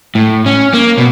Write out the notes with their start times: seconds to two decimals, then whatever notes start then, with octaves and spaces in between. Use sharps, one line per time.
0.15 A2
0.46 C#4
0.74 A#3
0.98 B2